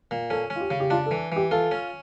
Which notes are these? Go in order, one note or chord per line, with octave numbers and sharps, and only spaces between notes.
A#2
C#4 A4
C#4
F4
G4
C#3
G4
D4 F4
A4
E3
E3 G4
F4 A4
C#4